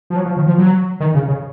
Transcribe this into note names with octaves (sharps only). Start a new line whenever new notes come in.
F3
F#3
F3
D#3
F3
F#3
D#3
C#3
C#3